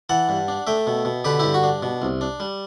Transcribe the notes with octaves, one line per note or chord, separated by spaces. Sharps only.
E3 F#5 A5
G2
D4
A3 E5 G5
B2
B2
D3 G4 B4
G2 E4 G4
F#4
D4
B2
C2
D4
G3